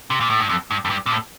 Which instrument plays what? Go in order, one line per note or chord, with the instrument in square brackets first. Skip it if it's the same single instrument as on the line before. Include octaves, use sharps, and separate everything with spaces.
[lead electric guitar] C3
A#2
A2
G2
F2
G2
F2
G2
A#2
A2